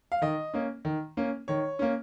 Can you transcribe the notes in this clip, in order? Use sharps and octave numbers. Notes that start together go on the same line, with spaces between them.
F5
D#3 D#5
A#3 C#4
D#3
A#3 C#4
D#3 C#5
A#3 C#4